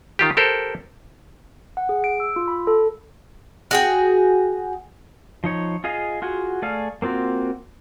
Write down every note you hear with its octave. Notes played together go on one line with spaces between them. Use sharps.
D#3 F4 G4
G4 A4 A#4 C5
F#5
G#4
D7
E6
F4
B5
A4
F#4 G#4 G5
F3 D#4 C#5
F4 G#4 D#5 F5
F4 F#4 G#4
A3 G#4 D5 F5 F6
A#3 C4 F4 F#4